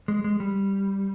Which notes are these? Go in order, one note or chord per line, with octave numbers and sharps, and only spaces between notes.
G#3
G#3
G3